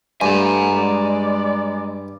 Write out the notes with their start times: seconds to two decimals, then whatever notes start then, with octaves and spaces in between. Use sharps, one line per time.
0.21 G2 A3 G#5 A#5
0.74 G#3 D5